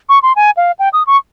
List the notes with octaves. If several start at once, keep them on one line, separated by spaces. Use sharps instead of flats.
C#6
C6
G#5
F5
G5
D#6
C#6